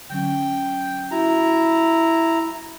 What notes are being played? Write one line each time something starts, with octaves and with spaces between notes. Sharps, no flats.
D3 F#3 C#4 G5
E4 F#4 A#5